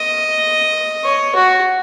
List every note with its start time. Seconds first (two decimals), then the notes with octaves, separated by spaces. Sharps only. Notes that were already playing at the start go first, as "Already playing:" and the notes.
Already playing: D#5
1.05 C#5
1.35 F#4